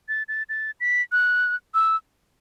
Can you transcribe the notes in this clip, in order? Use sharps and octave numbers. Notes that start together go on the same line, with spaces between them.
A6
A6
A6
B6
F#6
E6